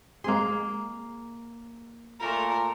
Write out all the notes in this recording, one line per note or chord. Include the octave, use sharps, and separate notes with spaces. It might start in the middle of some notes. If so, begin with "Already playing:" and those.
G#3 A#3 C4 G#4 C6
A#2 A3 A#4 A#5